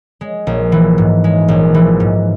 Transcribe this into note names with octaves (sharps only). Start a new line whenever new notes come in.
G#3
A#1
E3
G#2
G#3
A#1
E3
G#2